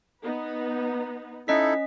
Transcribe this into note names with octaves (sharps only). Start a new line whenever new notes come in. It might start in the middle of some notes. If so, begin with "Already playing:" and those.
B3 D#4 B4
C#4 D#4 E4 A4 D#5 B6